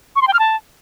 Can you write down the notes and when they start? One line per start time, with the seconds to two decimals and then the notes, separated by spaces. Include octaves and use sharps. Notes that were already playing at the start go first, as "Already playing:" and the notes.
0.16 C#6
0.22 C6
0.28 G5
0.33 F6
0.39 A5